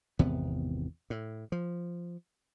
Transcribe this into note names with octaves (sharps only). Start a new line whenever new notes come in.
G#1 E2 C3 B3
A2
F3